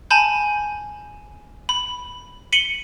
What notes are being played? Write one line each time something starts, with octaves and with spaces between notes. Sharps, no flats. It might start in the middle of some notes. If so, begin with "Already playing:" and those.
G#5 A5 B5 G6
B5
B6 C#7 D#7 F#7 G7